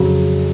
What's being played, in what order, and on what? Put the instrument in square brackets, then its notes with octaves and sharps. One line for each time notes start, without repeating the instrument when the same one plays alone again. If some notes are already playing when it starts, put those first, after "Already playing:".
Already playing: [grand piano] F2 C#3 F#3